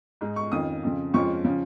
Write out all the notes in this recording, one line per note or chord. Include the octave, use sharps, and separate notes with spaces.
G#2 G#3 D#4
C#6
F2 D#3 C#4 F4 D#6
F2 C#3 F3
F2 F3 G#3 C#4 F4 C#6
C#3 F3 C#4